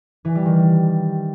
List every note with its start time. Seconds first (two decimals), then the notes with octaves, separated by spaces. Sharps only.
0.25 E3
0.35 G3
0.46 D#3